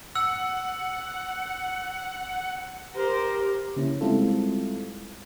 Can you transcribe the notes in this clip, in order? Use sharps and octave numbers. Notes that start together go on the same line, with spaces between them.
F#5 E6
G4 A#4 C5
C#3 A#3 C#4 E4
G3 G#3 C4 E4 F4 A4